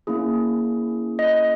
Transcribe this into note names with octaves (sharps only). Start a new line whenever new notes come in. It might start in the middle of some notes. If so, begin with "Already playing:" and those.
A#3 C#4 E4 G#4
D#5